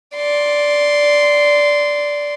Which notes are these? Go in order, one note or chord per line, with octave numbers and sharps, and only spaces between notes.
D5 C6